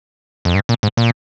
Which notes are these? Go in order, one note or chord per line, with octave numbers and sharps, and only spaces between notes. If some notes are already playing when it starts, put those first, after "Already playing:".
F2
G2
A#2
G#2
A#2